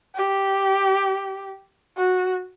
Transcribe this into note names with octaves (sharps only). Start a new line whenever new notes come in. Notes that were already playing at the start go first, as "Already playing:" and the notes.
G4
F#4